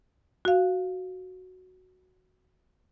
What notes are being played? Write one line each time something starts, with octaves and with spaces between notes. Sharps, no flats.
F#4 F5